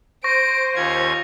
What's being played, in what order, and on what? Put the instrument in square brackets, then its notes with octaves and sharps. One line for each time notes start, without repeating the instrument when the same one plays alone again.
[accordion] C5 [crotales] C#6 A#6 [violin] D7
[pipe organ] D#2 C#4 G#6 [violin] F4